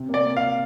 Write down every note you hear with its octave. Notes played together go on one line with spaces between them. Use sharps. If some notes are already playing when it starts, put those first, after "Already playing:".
Already playing: C3
A#3
D5
A#3
F5
A#3